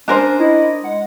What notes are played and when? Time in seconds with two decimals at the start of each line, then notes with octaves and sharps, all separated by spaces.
0.08 C#4 D4 A#4 C5 G#5
0.40 E4 D#5
0.84 G#3 F#5